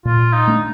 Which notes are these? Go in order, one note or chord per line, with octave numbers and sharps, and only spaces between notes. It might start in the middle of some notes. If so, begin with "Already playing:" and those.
A#2 F4
D#4
A3 D4